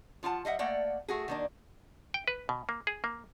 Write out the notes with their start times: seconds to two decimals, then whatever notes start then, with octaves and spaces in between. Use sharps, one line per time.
0.23 F3 F4 F#5 A5
0.45 G3 D#5 E5 F#5
0.59 A3 A#3 D5 F#5 G5
1.08 A3 F#4 G#4
1.28 D#3 A#3 D4
2.14 G5
2.28 B4
2.49 B2
2.69 A#3
2.87 G#4
3.04 A#3